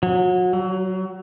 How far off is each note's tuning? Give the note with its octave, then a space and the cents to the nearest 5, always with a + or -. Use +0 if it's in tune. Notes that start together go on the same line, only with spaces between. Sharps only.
F#3 -30
F#3 +25